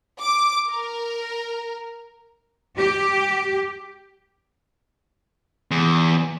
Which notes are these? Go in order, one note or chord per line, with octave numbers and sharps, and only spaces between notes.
D6
A#4
G4
E2